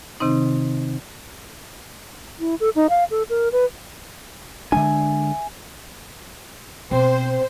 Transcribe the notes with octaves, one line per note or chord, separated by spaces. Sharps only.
C3 D#3 C4 D#4
E4
A4
D#4
F5
A4
A#4
B4
D3 G#3 D4 E5 G#5
B2 C4 C5